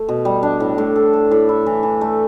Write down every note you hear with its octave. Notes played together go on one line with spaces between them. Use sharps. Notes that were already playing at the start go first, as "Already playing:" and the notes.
Already playing: A3
B2
G3
D4
A2
A2
A4
A4
A2
E4
E3
E3
A3